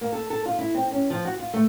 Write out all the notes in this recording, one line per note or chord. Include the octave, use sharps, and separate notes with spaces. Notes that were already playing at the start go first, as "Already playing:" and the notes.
A#3
A4
A4
F4
E4
C4
C#4
F3
F#4
F4
A3